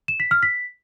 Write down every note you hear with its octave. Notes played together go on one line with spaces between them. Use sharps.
E7
B6
F6
B6